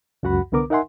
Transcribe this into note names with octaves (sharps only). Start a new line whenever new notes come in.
C#2 F#2 F#4 F#5 B5
C2 D3 B3 A#4 D6
D#4 A#4 E5 F#5 G#5 C6